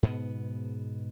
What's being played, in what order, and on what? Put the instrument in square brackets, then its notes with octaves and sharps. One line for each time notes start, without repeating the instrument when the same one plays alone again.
[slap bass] G#2 B2 B3